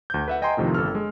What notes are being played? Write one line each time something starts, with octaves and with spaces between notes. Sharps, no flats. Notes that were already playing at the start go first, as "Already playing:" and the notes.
D2 G6
B4 E5 F#5
D#5 G5 G#5 A#5 C6
F2 A2 C3 D#3 F3
G1 A4 E6 F6
G#3